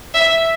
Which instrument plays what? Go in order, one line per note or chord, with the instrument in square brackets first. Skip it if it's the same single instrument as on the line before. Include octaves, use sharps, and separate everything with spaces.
[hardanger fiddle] E5